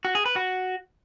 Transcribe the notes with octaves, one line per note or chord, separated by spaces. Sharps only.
F#4
G#4
B4
F#4